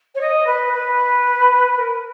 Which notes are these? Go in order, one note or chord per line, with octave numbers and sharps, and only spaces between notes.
C#5
D#5
B4
B4
A#4